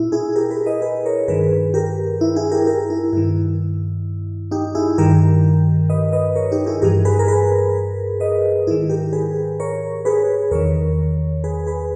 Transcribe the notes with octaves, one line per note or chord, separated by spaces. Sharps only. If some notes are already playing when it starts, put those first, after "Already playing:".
Already playing: A#2 E4
E4 G#4
G4 A#4
G#4 B4
B4 D#5
G#4 B4
A#4 C#5
G2 D#3 G#4 B4
G4 A#4
E4
E4 G#4
G4 A#4
G4 A#4
E4
G2 D#3 E4
D#4 G4
E4 G#4
G2 D#3 G4 A#4
B4 D#5
B4 D#5
A#4 C#5
D#4 G4
E4 G#4
G2 E3 G4 A#4
G#4 B4
A#4
G#4 B4
B4 D#5
G#2 D#3 E4 G#4
G4 A#4
G#4 B4
A#4 C#5
G#4 B4
E2 D#3 A#4 C#5
G#4 B4
G#4 B4